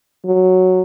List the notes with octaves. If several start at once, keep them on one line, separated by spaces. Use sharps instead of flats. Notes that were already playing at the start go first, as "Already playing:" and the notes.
F#3